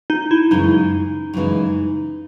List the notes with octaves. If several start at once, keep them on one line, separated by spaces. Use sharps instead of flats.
D#4
E4
F#2 C#3 E3 G#3 D#4
F#2 C#3 E3 G#3